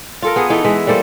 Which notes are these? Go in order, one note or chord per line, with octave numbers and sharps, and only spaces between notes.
F4 A4 A#4
B3 G#4
E3 D#4 A4
E3 G#3 E5
G3 A#3 A4 C5